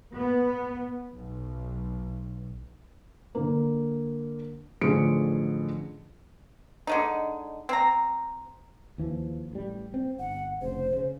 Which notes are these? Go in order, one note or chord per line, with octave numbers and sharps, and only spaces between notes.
B3
B1
D3 A#3
A1 D3 F3 G#4 C#7 D7
D3 G#3 D#4
C4 A#5
D#2 E3 F3
A1 G3
C4
G1 F#5
F1 C#3 C5
C#3